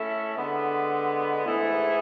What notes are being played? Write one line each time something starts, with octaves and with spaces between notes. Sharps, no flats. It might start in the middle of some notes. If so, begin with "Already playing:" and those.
Already playing: A3 C#4 E4 A4 E5
D3 G#3 B3
G#2 E3 A3 E4 G#4